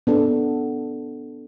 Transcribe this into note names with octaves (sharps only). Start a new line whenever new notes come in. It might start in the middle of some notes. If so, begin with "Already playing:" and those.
B3 D4 A4